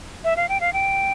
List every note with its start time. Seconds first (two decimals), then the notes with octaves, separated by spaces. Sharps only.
0.24 E5
0.37 F5
0.49 G5
0.60 F5
0.73 G5